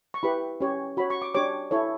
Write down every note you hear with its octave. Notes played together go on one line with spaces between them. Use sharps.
C#6
E4 G4 B4 B5
C#4 G4 C#5
F#4 C#5 B5
C#6
D6
D4 G4 C#5 D6
E4 A4 C#5